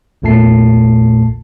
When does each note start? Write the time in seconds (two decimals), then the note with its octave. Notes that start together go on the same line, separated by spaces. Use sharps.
0.22 A#1 E2 A#2 A3 A5 C7